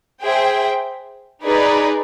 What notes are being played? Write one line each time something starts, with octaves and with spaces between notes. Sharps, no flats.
G#4 C5 E5 G5
D#4 G#4 B4 D5